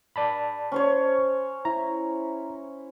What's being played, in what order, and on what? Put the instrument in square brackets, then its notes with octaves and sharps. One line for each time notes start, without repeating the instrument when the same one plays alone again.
[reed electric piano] D5 A5 B5
[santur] C#4 C5 C#5
[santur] E4 [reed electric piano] A#5